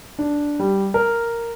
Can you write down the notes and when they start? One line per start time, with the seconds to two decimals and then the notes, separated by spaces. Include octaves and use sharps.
0.19 D4
0.59 G3
0.94 A#4